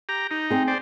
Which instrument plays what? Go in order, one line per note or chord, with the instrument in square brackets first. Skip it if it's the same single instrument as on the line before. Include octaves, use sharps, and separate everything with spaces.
[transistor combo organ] G4 A#5
D#4
[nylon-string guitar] C4 G#4
[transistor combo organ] C5 D5